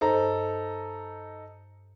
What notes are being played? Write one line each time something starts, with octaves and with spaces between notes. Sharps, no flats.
G2 D#4 A4 C5 A#5